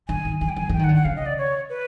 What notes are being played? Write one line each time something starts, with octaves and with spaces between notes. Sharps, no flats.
D3 G#5
D#3
E3 G#5
G5
E3 G#5
E3 G5
D#3
F#5
D3
F#5
C#3 F5
D#5
D5
C#5
B4